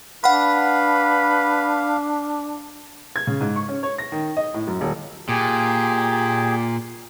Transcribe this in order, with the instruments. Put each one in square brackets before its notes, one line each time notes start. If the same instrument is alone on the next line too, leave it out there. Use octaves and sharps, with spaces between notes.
[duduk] D4 [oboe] B4 [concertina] F5 [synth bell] F#5 B5
[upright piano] G#6
C#3
G#2
C#6
C#4
C#5
A#6
D#3
D#5
A2
F#2
D#1
[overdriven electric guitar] A#2 [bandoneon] G4 G#4